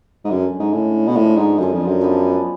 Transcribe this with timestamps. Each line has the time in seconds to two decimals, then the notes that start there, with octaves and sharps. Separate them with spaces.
0.25 G#2
0.30 F#2 D3 G#3 C#4
0.59 G#2
0.73 A2 D3 G#3 C#4
1.07 B2
1.15 A2 D3 F3 G#3
1.37 G#2
1.58 F#2 D3 F3 G#3
1.73 F2
1.87 F#2
2.01 F3 G#3 B3 D4